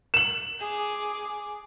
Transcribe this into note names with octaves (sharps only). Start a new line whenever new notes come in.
E7 F#7
G#4 D6